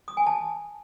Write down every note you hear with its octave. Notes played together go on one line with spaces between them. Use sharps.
D#6
G#5
A5